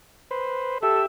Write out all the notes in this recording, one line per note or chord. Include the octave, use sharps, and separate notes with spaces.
B4 C5
G4 A4 E5 E6